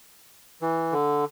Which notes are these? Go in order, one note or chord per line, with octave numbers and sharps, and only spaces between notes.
E3
D3